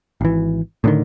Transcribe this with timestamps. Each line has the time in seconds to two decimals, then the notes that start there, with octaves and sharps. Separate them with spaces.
0.21 G#1 E3
0.84 A2 D3 D#3